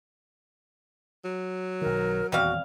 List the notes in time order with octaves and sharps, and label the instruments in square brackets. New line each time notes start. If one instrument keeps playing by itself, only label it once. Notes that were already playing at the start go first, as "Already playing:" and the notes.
[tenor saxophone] F#3
[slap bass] B1 D#3 [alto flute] A#4
[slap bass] D#1 E2 [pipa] G3 C4 F5 [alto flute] F#4